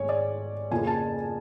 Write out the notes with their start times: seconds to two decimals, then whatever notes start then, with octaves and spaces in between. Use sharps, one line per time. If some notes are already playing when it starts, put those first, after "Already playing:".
Already playing: G#1 G#2 A3 C4 C#5 G#5
0.09 D5
0.71 F2 C#3 F3 A#3 G#5
0.87 A5